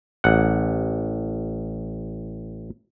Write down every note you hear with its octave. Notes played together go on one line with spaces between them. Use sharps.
A1 F#5